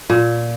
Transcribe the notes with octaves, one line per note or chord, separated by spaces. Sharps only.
A#2